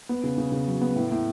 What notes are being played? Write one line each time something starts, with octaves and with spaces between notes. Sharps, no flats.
B3
C#3
C#3
C#3
F#3
B3
A2
A2